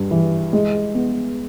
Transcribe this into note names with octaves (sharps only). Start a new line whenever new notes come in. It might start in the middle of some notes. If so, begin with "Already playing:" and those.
Already playing: G2
E3
G#3
B3